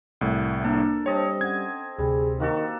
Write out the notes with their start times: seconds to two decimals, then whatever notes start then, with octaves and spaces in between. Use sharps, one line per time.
0.21 C2 A2
0.64 A#3 D4 A4 A#4
1.06 G3 C4 C#5 D#5 A5
1.41 C#4 F#5 G#6
1.98 D2 C3 G3 G#4
2.40 D#3 A#3 F#4 A4